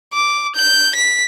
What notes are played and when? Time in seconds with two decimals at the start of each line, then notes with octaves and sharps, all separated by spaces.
0.13 D6
0.55 G6
0.95 B6